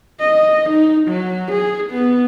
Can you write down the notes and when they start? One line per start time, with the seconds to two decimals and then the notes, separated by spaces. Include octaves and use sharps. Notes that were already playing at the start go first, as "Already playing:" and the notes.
0.20 D#5
0.70 D#4
1.08 F#3
1.52 G#4
1.90 B3